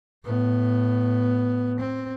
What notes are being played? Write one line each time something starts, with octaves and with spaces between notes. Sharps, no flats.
A2 B3
C4